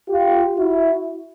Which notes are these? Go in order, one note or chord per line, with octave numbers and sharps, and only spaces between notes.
F4 G4
E4 F#4